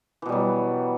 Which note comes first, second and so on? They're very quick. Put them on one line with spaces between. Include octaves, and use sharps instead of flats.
E3 B2 G3 F#3